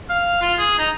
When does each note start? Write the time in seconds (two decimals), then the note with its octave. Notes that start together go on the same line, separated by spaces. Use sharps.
0.09 F5
0.42 F4
0.59 G#4
0.79 D#4